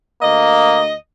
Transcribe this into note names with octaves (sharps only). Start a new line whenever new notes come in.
D2 A#3 D#5